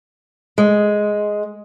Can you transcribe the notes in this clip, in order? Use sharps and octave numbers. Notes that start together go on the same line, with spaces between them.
G#3